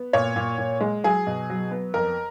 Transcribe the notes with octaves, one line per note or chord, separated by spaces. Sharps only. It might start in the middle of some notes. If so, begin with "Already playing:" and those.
Already playing: B3
A#2 C#5
A#2
A#2
G#3
F#3 G#4
B2
F#3
B3
F2 A#4